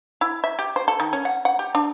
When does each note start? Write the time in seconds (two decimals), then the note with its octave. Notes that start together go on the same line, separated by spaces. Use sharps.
0.21 E4
0.44 E5
0.59 G4
0.76 C5
0.88 A4
1.00 D#3
1.13 C#4
1.25 F#5
1.45 F#5
1.59 G4
1.75 D4